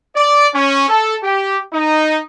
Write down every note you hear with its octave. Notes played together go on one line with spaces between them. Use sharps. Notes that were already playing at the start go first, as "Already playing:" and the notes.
D5
C#4
A4
G4
D#4